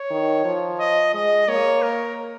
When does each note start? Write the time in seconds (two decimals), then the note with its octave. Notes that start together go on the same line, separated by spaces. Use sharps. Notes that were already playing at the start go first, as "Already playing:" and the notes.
Already playing: C#5
0.11 D#3
0.45 F3
0.80 D#5
1.14 G#3 D#5
1.48 A#3 C#5
1.82 A#4